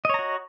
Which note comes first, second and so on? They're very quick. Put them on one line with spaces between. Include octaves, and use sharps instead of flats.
D#5 C#5 A#5 F#4